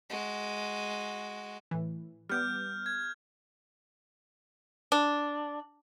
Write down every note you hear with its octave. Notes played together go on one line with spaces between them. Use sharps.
G#3 F#4
A2 E3
G3 B3 D6 F6 G6
G#6
D4